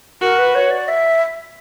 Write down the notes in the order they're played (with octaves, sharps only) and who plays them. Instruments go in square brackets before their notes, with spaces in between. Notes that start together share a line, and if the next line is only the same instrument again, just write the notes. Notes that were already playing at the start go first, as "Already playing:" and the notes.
[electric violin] F#4 [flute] A#4
[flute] B4
C#5
D5
E5